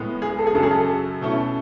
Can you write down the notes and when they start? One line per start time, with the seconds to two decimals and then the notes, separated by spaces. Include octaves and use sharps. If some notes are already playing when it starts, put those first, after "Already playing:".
Already playing: A2 G#3 B3
0.22 G#4
0.38 A4
0.47 G#4
0.55 F#2 C#3 F#3 C#4 A4
0.63 G#4
0.71 A4
1.21 B2 A3 C#4 E4